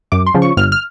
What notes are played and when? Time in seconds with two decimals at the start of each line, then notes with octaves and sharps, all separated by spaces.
0.12 F#2 D6
0.26 C6
0.34 C#3 F3
0.42 C#6
0.57 G1 F6
0.72 F6